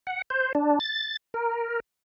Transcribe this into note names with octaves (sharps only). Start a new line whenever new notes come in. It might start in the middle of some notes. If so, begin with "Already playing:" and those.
F#5
C5
D4
A6
A#4